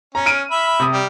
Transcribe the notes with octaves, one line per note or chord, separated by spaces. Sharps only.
C#4 A#5
F6 D7 D#7
E5 B5
C3 D#6
G3